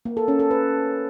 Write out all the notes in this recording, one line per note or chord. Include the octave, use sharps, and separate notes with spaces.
A#3
A4
C#4
A4
B4